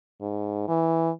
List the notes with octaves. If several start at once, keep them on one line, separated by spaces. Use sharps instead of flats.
G#2
E3